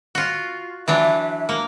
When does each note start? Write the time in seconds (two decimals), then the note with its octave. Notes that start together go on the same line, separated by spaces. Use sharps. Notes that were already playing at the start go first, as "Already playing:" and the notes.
0.15 F4 F#4
0.88 E3 F#3 D4 E5
1.49 A#3